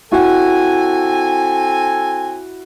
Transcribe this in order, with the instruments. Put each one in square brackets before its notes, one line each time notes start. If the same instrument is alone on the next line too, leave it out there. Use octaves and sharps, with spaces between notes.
[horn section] C4 A4 G#5 [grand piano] E4 F#4